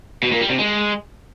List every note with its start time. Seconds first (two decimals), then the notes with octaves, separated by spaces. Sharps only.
0.23 B2
0.32 A#2
0.41 G3
0.50 C3
0.59 G#3